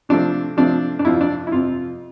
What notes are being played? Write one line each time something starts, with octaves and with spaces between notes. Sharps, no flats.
C3 F3 A3 C4 D4
C3 F3 A3 C4 D4
D4
F2 C3 F3 C4 E4
D4
E4
F2 C3 F3 C4 F4